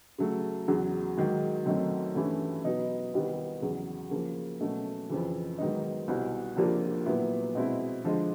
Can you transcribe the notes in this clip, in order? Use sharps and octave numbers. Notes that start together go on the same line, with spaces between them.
C#3 F#3 A3
E2 C#3 F#3
G#2 D#3 F#3
F#2 D#3 F#3 A3 C4
G2 E3 A3 C#4 E4
B2 F#3 B3 D#4
C2 C3 D#3 G3 B3
E2 C#3 F#3
C#3 F3 A#3
B2 F#3 A3 C#4
F2 C#3 E3
G#2 D#3 F#3 B3 D#4
C2 B2 G3
C#2 C3 F3 A#3 D4
A#2 F#3 B3 E4
B2 G#3 C4 E4
D3 F3 G#3